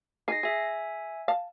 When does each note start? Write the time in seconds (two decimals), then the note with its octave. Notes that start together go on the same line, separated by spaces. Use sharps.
0.28 D#4 G#4 A#6 C7
0.43 G#4 E5 G#5
1.28 F5 A5